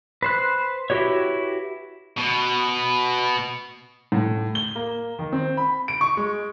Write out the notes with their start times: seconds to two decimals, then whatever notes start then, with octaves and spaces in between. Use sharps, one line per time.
0.22 B4 C5 F#6
0.90 E4 F#4 G4 B4 C#5
2.18 B2
4.12 A2
4.55 G7
4.75 A#3
5.19 D#3
5.32 C4
5.57 B5
5.88 D7
6.01 C#6
6.17 G#3